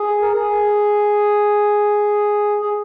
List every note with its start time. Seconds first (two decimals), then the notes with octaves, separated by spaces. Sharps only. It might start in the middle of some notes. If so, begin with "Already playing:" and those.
Already playing: G#4
0.22 A#4
0.32 G#4
2.62 G#4